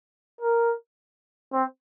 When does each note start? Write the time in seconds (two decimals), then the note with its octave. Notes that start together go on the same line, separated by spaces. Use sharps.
0.41 A#4
1.53 C4